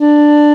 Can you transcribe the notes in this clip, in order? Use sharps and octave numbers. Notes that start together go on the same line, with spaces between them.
D4